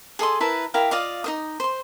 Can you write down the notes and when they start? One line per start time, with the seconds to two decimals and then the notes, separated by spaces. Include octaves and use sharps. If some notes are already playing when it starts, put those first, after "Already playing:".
0.19 G#4 A4 D#5 C6
0.40 E4 A#4 B4 A5
0.74 E4 G4 A#4 F5
0.91 F4 D5 D#5 F5
1.24 D#4 C5 D#6
1.60 C5 C6